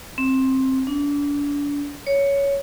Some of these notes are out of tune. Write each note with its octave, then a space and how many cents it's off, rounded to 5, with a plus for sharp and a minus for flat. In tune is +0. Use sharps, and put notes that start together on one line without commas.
C4 +15
D4 -35
C#5 +10